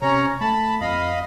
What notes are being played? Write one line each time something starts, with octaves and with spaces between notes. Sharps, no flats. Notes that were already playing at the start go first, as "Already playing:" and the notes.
C3 C#4 C#5 A#5
A3 A5 B5
F2 D#5 F5 B5